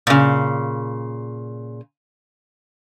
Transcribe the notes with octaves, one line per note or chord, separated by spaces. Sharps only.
A#2 C#3